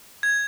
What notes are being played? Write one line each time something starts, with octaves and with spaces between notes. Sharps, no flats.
G#6